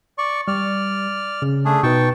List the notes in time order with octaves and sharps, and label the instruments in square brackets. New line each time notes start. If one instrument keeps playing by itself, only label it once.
[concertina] D5 C#6
[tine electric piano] G3 [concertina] D5 F6
[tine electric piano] C#3
[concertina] A3 D4 G#4
[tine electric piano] B2 D#4 B4 [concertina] G5 A5 C#6